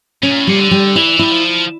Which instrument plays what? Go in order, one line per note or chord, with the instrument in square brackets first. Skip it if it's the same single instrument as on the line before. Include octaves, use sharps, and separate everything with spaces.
[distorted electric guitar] C#3 [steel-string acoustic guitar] C#4
[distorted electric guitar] A#2
A2
[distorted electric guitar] A#2 [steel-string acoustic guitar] G3
[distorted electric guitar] D3
[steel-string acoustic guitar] G3
[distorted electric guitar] E3 [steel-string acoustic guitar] E4
[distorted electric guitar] G3 [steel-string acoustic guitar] E4
[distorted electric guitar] F3